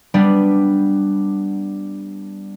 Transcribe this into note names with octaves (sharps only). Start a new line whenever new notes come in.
G3 B3 D4